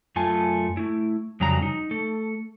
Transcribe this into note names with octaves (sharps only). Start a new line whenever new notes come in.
F#2 A3 F4 G#5 A5
A3 E4
F2 C#3 F#3 G3 A#5
D#4
A3 A4